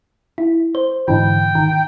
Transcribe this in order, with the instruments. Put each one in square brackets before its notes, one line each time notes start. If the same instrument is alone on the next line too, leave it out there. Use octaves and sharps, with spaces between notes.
[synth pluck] E4
C5
[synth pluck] G#2 D3 E3 [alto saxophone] G5
[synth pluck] D#3